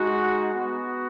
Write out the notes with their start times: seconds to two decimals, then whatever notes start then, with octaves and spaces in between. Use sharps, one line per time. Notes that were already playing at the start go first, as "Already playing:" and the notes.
Already playing: G#3 D#4 F#4
0.53 B3 F#4